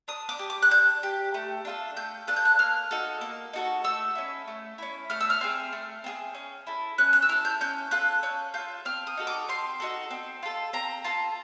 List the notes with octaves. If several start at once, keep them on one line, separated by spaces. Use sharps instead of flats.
D4 D#6
D6
G4
D6
F#6
D4 G6
G4
A3
D4 F4 A4
A3 G6
D4 F4 A4 F#6
G6
F#6
A#3 F6
D#4 F#4 A4
A#3
D#4 F#4 A4
A3 E6
C#4 E4
A3
C#4 E4
A3 F6
E6
F6
C4 F4 G#4
A3
C4 F4 G#4
C#4
E4 A4
C#4 F#6
F#6
E6
E4 A4 F6
G6
C#4 G6
F4 A4 F#6
C#4 G6
F4 A4 G6
C4 F6
D#6
D#4 F#4 A4
D6
C4 C6
D#4 F#4 A4
C4
F4 A4
C4 A#5
F4 A4 A5